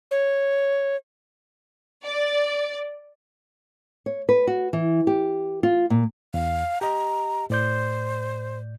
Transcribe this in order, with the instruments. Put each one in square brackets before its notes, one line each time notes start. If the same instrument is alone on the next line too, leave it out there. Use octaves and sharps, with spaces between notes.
[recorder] C#5
[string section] D5
[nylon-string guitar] C#5
B4
F#4
E3
G4
F4
A#2
[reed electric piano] E2 [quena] F5
[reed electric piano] G4 D#5 [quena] A#5
[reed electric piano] A2 D5 G6 [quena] C5